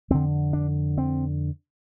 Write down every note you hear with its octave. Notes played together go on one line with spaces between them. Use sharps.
F2 D3 C4
D4
C4